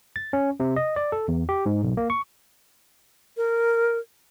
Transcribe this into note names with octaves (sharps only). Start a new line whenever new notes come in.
A6
C#4
C3
D#5
D5
A4
E2
G4
G#2
B1
A#3
C#6
A#4